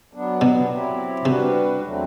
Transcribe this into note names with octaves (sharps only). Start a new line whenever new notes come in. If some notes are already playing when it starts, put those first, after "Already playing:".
F#3 B3 D4
B2
F#3 C4 E4 G4
C3 G3 D4 F#4 B4
E2 D3 F#3 A3 C4